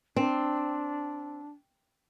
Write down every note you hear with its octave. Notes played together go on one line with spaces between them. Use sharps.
C4 D4